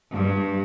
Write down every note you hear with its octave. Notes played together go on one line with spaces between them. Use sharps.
G2